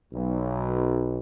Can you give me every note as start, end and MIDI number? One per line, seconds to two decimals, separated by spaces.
0.13 1.19 35